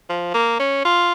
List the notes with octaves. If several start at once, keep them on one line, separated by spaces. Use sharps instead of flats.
F3
A#3
C#4
F4